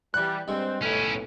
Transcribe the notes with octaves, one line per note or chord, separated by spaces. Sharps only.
E3 G3 F#5 F#6
G2 G3 G#3 C4
B1 A2 C#4 E4